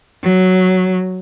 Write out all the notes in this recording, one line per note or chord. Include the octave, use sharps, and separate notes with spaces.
F#3